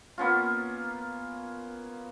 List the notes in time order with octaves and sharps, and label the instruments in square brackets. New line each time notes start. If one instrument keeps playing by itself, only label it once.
[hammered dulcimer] A#3 B3 C#4 F4